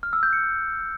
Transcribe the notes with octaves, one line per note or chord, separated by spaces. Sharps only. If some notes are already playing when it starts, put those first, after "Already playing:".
F6
E6
G6
C#7